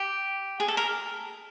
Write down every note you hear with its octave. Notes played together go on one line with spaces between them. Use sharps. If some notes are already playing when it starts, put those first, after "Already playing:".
Already playing: G4
G#4
A4
A#4